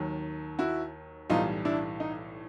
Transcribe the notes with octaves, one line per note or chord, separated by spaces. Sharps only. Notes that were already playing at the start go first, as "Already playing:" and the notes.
Already playing: D#2 D#3 F#3
E4 F#4
B1 A2 E3 G3 D#4 F4
D4 E4
D#4